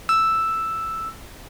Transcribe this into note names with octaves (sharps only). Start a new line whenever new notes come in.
E6